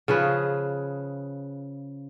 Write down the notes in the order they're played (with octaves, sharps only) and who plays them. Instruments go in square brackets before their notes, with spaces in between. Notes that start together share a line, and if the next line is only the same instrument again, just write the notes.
[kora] C#3 F3 G#4 B4